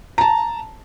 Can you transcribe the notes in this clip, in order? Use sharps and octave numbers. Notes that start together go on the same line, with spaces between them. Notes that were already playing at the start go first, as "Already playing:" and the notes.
A5 A#5